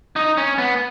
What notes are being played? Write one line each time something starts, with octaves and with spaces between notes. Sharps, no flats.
D#4
C#4
B3